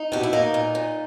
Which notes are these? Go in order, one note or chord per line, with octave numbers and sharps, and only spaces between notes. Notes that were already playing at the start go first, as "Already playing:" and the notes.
Already playing: D#4
B2 G4
E4
A#3 D#4
A#2
A#2